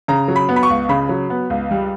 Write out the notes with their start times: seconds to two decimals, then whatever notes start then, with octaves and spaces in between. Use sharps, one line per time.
0.08 C#3 A#5
0.28 F#3
0.36 B5
0.49 B3
0.56 B5
0.63 C#6
0.70 C#2
0.89 C#3 B5
1.09 F#3
1.30 B3
1.50 C#2
1.71 G3